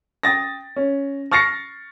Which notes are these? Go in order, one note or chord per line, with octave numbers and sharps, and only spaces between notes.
G5 D#6 A6 A#6
C#4
C#6 F6 A6 A#6 C7 C#7